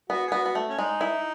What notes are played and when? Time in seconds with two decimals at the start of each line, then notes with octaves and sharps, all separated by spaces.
0.10 B3 F#4
0.27 G#4
0.32 B3 F#4
0.46 B3
0.55 A3
0.69 C#4
0.78 G#3 D#4
1.01 E4